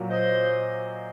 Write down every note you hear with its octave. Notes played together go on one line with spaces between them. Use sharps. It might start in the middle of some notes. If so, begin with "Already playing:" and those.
Already playing: A#2 F#3 A#3
C5 D#5